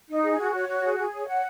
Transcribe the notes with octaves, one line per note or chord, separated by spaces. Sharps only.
D#4
G#4
F#4
C#5
F#4
G#4
G#4
C#5
F#5